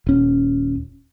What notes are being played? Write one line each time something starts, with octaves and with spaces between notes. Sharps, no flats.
D#1 C#4